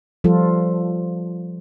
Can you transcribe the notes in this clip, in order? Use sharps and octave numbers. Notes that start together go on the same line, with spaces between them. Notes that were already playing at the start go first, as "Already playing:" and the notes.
F3 G3 F4 A4